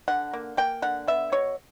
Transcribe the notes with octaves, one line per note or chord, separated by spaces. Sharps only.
D3 F#5
A#3
A#3 G5
D3 F#5
B3 E5
B2 C#5